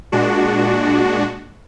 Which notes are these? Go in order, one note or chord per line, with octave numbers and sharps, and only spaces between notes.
A#2 G#3 D4 F#4